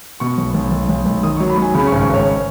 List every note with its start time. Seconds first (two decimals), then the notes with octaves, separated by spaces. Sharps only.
0.20 B2 C#6
0.38 B1
0.54 B1
0.71 B1
0.89 B1
1.06 B1
1.23 D#3 D#6
1.37 F#3 C#6
1.50 B5
1.58 F#3 G#5
1.74 C#3 B5
1.87 C#6
1.92 G#1
2.00 C#6
2.09 G#1 C#5